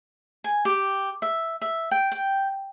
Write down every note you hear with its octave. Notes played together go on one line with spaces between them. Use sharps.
G#5
G4
E5
E5
G5
G5